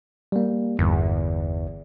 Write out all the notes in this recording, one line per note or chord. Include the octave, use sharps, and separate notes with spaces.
G3 A#3
G1 E2